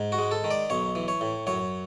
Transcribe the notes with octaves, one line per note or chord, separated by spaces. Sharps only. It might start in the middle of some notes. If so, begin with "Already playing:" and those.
Already playing: G#2
F#4
G#3
A4
D#3
D5
B1 C#5
E3
C#5
A2
F#2 C#5